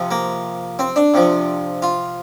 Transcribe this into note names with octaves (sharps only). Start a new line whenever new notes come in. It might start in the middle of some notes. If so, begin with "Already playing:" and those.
Already playing: C3 F3
A#3
C4
D4
C3 F3
F4